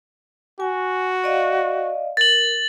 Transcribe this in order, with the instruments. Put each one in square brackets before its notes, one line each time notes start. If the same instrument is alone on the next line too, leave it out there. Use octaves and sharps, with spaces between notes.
[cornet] F#4 [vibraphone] G#5
[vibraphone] D5 D#5 F5
[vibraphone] A#4 [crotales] A6 F#7